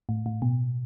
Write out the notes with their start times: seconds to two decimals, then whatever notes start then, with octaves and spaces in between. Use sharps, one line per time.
0.09 A2
0.26 A2
0.42 B2